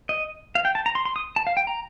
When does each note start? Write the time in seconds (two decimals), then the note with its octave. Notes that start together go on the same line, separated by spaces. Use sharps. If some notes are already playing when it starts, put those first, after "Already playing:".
0.09 D#5
0.55 F5
0.65 G5
0.75 A5
0.86 A#5
0.95 C6
1.05 C6
1.16 D#6
1.36 A5
1.47 F5
1.57 G5
1.67 A#5